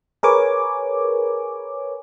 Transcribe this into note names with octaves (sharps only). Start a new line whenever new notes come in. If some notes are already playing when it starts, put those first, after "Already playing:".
G#4 A#4 B4 C#5 G#5 D6